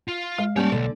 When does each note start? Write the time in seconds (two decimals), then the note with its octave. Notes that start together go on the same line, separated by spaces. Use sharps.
0.08 F4
0.38 G#3 F5
0.56 G3 A#3 C#4 C#5 D5 G#5 A5
0.72 B1 D3 D5